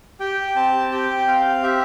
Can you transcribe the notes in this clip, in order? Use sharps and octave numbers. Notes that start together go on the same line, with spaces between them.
G4 G5
C4 A5
G4 G5
C4 F5
G4 E5